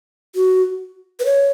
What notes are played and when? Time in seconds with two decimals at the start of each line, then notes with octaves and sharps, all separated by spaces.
0.35 F#4
1.20 B4
1.25 C#5